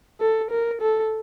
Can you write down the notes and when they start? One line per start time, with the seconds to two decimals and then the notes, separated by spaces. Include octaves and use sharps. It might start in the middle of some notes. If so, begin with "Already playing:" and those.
0.21 A4
0.50 A#4
0.81 A4